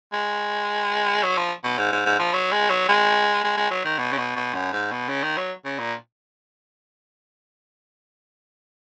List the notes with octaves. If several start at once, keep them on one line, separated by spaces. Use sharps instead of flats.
G#3
F#3
F3
B2
G#2
G#2
G#2
F3
F#3
G#3
F#3
G#3
G#3
G#3
F#3
D#3
B2
C#3
B2
B2
F#2
G#2
B2
C#3
D#3
F#3
C#3
A#2